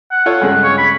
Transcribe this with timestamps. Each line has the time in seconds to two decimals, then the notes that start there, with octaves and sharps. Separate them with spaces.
0.11 F#5
0.26 F4 A4 C#5
0.41 G2 C#3 G#3
0.63 C#5
0.78 B5